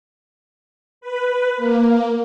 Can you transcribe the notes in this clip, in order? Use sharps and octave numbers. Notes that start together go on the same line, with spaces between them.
B4
A#3